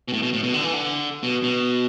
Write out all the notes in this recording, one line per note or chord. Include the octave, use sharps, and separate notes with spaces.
B2
A2
B2
A2
B2
D3
E3
D3
B2
B2